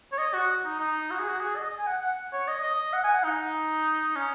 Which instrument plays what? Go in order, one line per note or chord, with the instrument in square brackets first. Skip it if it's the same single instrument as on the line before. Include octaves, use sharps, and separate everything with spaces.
[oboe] C#5
D#5
F#4
D#4
D#4
F#4
G#4
F#4
G#4
D#5
G#5
F#5
F#5
C#5
D#5
D#5
F#5
G#5
F#5
D#4
C#4